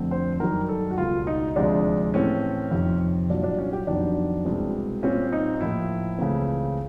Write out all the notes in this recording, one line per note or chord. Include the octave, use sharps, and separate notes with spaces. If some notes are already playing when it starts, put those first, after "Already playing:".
Already playing: F2 D3 F3 A3 C4
C5
F#2 D#3 G3 A#4
A4
F#4
C#2 B2 G3 F4
D#4
D2 C3 F3 G#3 D4
A2 E3 A3 C4 C#4
F2 C3 D#3
C2 A#2 F#3 D4
D4
C#4
G4
F2 C3 D#3 F#3 B3 D4
C2 B2 G#3 C4
A#2 G3 C4 C#4
D#4
A2 F3 A#3 E4
C#2 C#3 E3 A3 C4